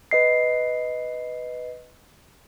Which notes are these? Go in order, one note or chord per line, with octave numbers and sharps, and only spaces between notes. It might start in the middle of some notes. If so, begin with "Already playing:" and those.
B4 D#5 C7